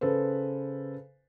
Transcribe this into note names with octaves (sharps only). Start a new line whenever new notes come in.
C#3 A4 B4 C5